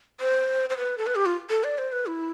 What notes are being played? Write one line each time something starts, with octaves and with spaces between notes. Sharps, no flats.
C5
C5
B4
A4
B4
G4
F4
A4
D5
C5
B4
E4